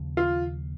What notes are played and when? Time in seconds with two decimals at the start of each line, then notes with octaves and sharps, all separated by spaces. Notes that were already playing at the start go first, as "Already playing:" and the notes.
Already playing: D#2 C#3 F3 A#3
0.17 F4